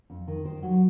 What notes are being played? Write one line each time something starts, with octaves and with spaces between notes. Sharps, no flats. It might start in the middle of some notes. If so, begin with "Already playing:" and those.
F2
D#3
D#3 C5
F#3